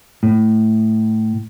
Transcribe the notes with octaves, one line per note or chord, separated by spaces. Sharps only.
A2